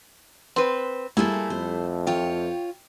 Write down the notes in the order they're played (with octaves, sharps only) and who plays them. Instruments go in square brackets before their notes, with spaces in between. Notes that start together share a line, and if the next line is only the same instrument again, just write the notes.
[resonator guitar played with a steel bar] C4 B4
[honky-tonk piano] G3 [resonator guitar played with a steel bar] A3 E4 [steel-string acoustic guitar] A#3 G#4 C5
[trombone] F2 [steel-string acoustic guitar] C5
[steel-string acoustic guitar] F4 C#5 [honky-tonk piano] G5